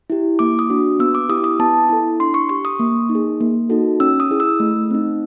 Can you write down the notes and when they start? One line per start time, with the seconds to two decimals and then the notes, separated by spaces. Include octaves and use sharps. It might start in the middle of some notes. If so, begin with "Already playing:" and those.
0.10 E4 G4
0.39 A#3 D6
0.59 D#6
0.70 D4 F#4
0.99 B3 E6
1.15 D6
1.29 E4 G4 D#6
1.44 D#6
1.60 B3 A5
1.89 E4 A4
2.20 D4 C6
2.34 C#6
2.49 G4 C#6
2.65 D#6
2.80 A#3
3.09 D#4
3.15 G#4
3.41 A#3
3.70 D#4 F#4 A4
4.00 C#4 E6
4.20 D#6
4.30 E4 G#4
4.40 E6
4.60 A3
4.91 C4 D#4